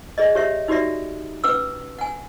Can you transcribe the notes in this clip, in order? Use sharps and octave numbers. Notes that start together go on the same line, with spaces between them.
G#4 D5 D#5
G4 C#5 E5
D#4 F#4 G4 D5 E5
C#4 B4 D6 E6
F#5 G#5